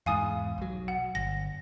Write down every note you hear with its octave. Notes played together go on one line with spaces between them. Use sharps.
E2 G#2 F5 G#5 D#6
B1 F#3
F#5
G1 A#6